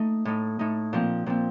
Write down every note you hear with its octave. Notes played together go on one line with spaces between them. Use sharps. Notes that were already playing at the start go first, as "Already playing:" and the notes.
Already playing: A3 D#4
A2 A3 D#4
A2 A3 D#4
A#2 F3 C4
A#2 F3 C4